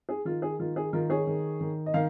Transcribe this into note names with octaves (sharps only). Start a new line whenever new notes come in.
G#4
D#3 F4
G#4
D#3 F4
G#4
D#3 F4 A#4
G#4 C#5
D#3
D#3
D#5
D#3 F5